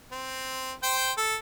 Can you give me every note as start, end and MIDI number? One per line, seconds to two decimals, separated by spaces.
0.12 0.73 60
0.83 1.12 72
0.83 1.12 79
1.17 1.37 69